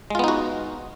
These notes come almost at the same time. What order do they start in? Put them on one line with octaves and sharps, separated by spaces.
G#3 F4 B3 D#4 F#4